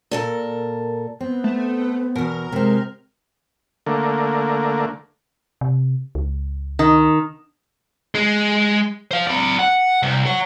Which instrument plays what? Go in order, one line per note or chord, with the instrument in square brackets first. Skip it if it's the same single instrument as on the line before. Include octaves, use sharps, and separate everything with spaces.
[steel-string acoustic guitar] A#2 A4 A#4
[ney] B3 [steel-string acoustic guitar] C4
[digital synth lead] A3
[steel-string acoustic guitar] E2 B2 [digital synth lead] A#4
[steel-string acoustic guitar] C3 C4 [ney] G#3
[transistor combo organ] D3 A3 A#3
[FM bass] C3
C#2
[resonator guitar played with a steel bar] D#3
[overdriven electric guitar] G#3
C5 F5
E4 D5
F#5
C2
C#5 F#5